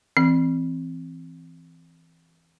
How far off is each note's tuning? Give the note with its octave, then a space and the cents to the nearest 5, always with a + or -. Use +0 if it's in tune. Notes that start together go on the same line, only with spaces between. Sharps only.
E3 +0 C4 +0